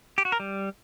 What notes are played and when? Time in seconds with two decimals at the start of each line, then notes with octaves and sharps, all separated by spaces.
0.18 G4
0.25 F#4
0.32 A#4
0.40 G3